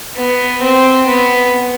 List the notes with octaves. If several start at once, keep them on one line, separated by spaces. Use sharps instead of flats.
B3
C4
B3